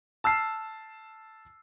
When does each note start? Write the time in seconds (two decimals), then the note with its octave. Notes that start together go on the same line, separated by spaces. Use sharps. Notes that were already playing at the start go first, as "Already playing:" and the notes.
0.24 A5 E6 F6 C7